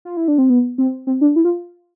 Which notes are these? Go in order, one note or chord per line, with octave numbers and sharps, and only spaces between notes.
F4
E4
D4
C4
B3
C4
C4
D4
E4
F4